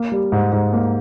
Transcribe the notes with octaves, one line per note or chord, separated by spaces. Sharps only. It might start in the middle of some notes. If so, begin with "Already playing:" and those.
Already playing: A#3
G3
G#2
G#2
A#3